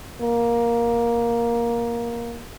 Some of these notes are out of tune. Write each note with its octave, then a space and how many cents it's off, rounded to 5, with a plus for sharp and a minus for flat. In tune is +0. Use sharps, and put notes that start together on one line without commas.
A#3 +10